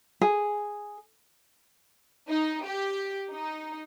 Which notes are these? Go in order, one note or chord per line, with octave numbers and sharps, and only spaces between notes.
G#4
D#4
G4
D#4